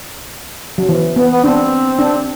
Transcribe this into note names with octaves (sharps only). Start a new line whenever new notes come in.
F#3
E3
B3
B3
C4 D4
D4